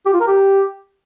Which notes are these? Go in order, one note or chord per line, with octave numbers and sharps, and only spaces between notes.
G4
F4
A#4
G4